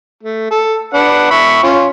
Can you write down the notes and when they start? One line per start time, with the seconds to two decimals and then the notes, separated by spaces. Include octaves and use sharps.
0.23 A3
0.50 A4
0.94 D4 B4 F#5
1.31 E5 B5 C#6
1.63 C#4 F4